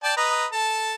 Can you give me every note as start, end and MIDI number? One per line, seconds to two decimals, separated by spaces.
0.04 0.14 74
0.04 0.14 79
0.04 0.14 81
0.17 0.46 71
0.17 0.46 75
0.17 0.46 82
0.53 0.95 69
0.53 0.95 81